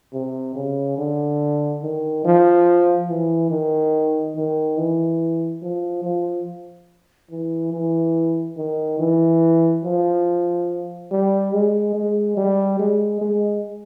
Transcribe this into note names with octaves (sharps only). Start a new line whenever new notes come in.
C3
C#3
D3
D#3
F3
E3
D#3
D#3
E3
F3
F3
E3
E3
D#3
E3
F3
G3
G#3
G#3
G3
G#3
G#3